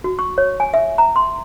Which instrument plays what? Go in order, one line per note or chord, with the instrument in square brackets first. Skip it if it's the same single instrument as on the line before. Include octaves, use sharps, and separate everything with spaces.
[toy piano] F#4
C#6
C#5
G#5
E5
A#5
C6